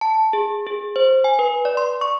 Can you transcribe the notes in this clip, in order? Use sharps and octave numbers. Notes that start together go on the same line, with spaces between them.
A5
G#4
G#4
C5
G#5
B4
D5
C6
C#6